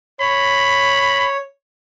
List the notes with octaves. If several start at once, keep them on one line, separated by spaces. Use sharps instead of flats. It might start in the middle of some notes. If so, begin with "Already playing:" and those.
C#5 B5